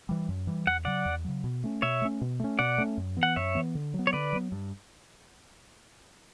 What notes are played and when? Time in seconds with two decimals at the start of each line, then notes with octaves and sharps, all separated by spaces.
0.09 E3 G3
0.28 F#2
0.47 E3 G3
0.67 E2 F#5
0.85 C#3 F#3 D5 F#5
1.06 E2
1.25 C#3 F#3
1.44 B2
1.64 A3 C#4
1.82 B2 C#5 E5
2.02 A3 C#4
2.21 B2
2.40 A3 C#4
2.59 B2 D5 F#5
2.78 A3 C#4
2.97 F#2
3.17 E3 B3
3.23 F#5
3.36 F#2 C#5 E5
3.55 E3 B3
3.75 D3
3.94 F#3
3.99 B3
4.07 C#5
4.13 D3 B4 D5
4.32 F#3 B3
4.52 G2